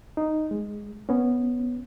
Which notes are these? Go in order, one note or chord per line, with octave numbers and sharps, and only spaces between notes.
D#4
G#3
B3 C#4